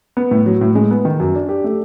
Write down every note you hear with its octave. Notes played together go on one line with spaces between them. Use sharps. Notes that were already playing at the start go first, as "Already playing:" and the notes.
B3
A2
F#3
A2
G#3
B3
D#3
F#2
D4
G4
A3